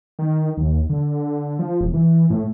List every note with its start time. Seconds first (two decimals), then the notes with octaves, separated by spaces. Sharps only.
0.19 D#3
0.57 D#2
0.90 D3
1.59 F3
1.81 E1
1.94 E3
2.30 A2